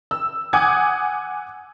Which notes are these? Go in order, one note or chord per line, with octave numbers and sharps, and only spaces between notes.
E6
F#5 G#5 D6 D#6 G6 G#6